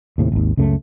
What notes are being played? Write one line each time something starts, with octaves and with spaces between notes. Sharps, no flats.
D#2 A2 C3
G#1 D#2
C#2 F#2 C#3 A3